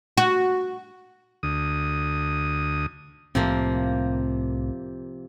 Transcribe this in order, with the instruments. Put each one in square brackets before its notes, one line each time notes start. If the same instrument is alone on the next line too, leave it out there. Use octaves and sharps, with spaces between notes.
[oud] F#4
[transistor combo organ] D2 D#6
[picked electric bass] C2 A2 C4 [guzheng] C3 F3 A#3